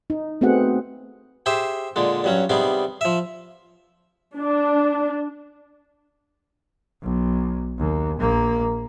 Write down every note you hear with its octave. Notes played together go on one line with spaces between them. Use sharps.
D#4
A3 B3 C4 F#4 G#4 F#5
G4 G#4 C5 E5
A#2 D3 G#3
G2 F#3 C#4
C3 G3 B3 D#4 G#4
F3 E5
D4
B1
D#2
A#1 A#3